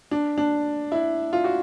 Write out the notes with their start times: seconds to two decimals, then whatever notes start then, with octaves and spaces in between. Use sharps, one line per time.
0.11 D4
0.38 D4
0.92 E4
1.33 F4
1.44 F#4